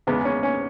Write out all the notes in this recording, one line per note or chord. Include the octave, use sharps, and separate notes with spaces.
E2 C#3 G#3 B3
C#4
C#4